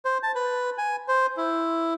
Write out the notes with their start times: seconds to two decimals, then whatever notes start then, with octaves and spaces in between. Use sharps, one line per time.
0.05 C5
0.23 A5
0.35 B4
0.78 G#5
1.08 C5
1.37 E4